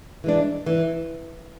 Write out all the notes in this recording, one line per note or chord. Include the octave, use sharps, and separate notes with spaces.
E3 G#3 D4
E3